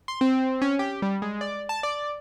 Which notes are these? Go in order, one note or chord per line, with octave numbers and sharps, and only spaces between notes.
C6
C4
C#4
G4
G3
G#3
D5
A5
D5